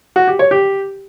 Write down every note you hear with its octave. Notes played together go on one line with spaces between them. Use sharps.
F#4
G4
C#5
G4